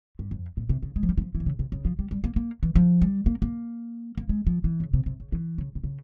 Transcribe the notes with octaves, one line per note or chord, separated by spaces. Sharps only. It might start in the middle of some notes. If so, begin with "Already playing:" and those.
G2
F2
A#2
C3
C#3
G#3
F3
G3
E3
F3
E3
C3
C#3
C3
C#3
F3
G3
G3
A#3
A#3
E3
F3
G3
A#3
A#3
A#3
G#3
F3
E3
C#3
C3
C3
C#3
E3
C#3
C3
C#3